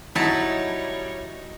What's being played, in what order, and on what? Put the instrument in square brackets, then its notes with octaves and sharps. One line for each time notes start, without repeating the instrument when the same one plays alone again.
[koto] F#3 A5 [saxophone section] G3 C#5 [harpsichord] D#4 [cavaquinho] E4